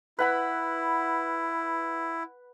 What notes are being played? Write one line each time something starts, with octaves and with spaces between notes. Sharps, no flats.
E4 B4 F#5 B5